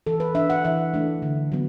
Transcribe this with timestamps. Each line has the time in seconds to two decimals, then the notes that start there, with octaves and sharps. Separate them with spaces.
0.06 E3 A4
0.20 B4
0.35 D4 E5
0.50 F#5
0.65 E3 E5
0.94 A3 D4
1.22 D3
1.52 F#3 B3